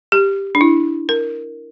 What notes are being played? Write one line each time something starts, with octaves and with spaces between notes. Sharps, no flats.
G4
D4
E4
A#4